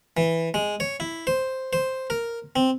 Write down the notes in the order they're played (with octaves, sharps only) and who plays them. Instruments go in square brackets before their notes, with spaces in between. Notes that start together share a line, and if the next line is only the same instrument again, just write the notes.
[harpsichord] E3
G#3
C#5
E4
C5
C5
A#4
C4